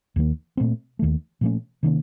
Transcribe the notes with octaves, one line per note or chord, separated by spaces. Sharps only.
D#2 D#3 A#3
A#2 A3 C4
D#2 D#3 A3
A#2 F3 A3 C#4
C3 D#3 A#3 C#4